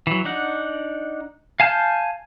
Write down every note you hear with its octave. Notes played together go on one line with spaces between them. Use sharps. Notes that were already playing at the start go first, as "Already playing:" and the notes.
E3 F#3
D4 D#4 F#5
F5 G#5 A5 F6 G6